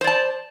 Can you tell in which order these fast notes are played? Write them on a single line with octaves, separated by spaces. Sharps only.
C5 D5 A5